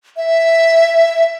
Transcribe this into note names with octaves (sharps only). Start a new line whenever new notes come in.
E5